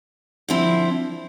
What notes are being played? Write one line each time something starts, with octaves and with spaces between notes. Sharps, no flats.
D3 F3 C4 E4